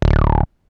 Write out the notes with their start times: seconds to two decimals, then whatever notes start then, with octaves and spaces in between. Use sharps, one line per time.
0.02 D1